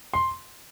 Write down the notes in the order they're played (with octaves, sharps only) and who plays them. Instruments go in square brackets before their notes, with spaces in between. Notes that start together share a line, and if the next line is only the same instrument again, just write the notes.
[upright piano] C6